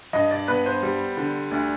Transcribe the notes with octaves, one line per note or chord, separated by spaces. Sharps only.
G2 D#5
D5
B3 B4
C5
G3
D3
D2 D5